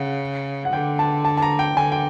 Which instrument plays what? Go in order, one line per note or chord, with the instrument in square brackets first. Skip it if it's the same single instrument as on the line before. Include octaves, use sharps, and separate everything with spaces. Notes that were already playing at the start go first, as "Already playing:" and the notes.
Already playing: [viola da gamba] C#3 [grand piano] F#5
[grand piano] F#5
[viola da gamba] D3 [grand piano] G5
[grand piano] A5
A5
A5
A#5
G5
[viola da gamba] D3 [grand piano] G#5
[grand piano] G5